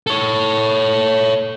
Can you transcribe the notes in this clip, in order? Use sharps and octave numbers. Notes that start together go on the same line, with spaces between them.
A4 C#5